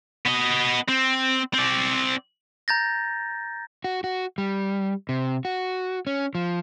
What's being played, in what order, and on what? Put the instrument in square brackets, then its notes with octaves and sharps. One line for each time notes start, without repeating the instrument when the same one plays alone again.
[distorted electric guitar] B3 D#5
C4
C4 D5
[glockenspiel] A#5 G6 A6 A#6
[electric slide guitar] F#4
F#4
G3
C3
F#4
C#4
F3